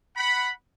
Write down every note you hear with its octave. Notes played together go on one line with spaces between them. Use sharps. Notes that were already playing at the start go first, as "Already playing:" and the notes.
F#5 B5